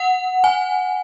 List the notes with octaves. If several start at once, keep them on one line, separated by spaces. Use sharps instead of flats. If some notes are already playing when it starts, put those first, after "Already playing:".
Already playing: F#5
G#5